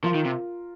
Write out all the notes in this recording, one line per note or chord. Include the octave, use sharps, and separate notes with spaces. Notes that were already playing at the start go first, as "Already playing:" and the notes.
F3 F4 A#4
D#3
C3